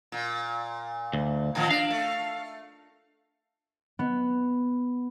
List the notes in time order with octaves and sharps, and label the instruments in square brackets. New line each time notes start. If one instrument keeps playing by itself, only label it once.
[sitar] A#2
[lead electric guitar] D2
[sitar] A2 D#3 F3
[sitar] D4 [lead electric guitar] F5
[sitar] A3
[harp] B3